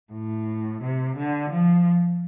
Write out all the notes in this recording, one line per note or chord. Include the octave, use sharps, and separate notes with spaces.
A2
C3
D3
F3